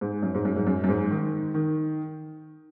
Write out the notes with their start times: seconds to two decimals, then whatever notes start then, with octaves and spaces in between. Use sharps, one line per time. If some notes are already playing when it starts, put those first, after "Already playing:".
0.01 G#2
0.23 F#2
0.35 G#2
0.45 F#2
0.56 G#2
0.67 F#2
0.84 F#2
0.89 G#2
1.11 D#3
1.54 D#3